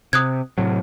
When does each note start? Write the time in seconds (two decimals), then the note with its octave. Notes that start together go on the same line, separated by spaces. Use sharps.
0.13 C3 D#6 F#6 G#6
0.58 A2 C3 F#3